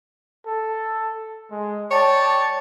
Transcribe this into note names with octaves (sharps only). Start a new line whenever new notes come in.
A4
G#3
C#5 D5 G5 A5